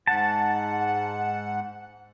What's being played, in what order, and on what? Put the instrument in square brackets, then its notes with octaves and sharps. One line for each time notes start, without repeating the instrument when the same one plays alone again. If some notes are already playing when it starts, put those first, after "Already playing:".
[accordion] G#2 F#5 [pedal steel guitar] A5